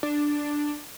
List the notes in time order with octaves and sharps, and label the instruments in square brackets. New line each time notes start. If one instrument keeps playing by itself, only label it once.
[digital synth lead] D4